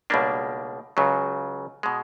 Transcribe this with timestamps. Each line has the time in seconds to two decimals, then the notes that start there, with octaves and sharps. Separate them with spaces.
0.10 C#2 B2 G3 A#3 D4
0.97 C#2 C#3 F#3
1.83 B2 G#3